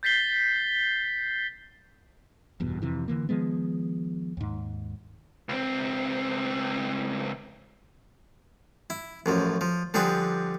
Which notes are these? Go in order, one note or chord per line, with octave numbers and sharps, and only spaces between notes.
G6 A6 B6 C7 G7
F1 E2 G2 B2
F2 C3 E3
D3 E3 A#3
D#3 F3 G#3 B3
D#2 G#2
C#2 C4
E4
A1 F#2 F3
F3
D3 F3 G3 G#4 B4